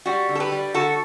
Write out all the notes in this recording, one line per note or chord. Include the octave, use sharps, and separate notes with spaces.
G3 F#4
D3
A4
G4 B4
G3
D3 F#4 A4